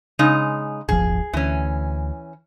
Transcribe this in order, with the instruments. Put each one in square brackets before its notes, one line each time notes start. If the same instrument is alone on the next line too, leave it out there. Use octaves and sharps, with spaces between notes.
[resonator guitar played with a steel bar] C#3 G#3 D#4
[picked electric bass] D1 G1 F3 [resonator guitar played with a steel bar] G#4
[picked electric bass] D2 [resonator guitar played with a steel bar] E3 C#4